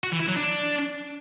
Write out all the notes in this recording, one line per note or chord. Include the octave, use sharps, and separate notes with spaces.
F#4
E3
E4
F#3
D4